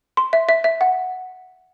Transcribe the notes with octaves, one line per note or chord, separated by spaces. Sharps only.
C6
E5
E5
E5
F#5